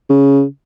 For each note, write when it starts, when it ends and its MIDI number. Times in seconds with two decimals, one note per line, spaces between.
0.10 0.43 49